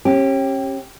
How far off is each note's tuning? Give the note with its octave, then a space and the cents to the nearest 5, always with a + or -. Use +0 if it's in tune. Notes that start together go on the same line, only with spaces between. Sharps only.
C#4 -35 G4 -5